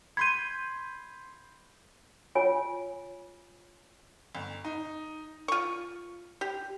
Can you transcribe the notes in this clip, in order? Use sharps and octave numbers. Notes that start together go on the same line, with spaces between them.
B5 C6 G6 G#6 D#7
F4 C#5 G#5
G1
D#4
F4 C#6
G4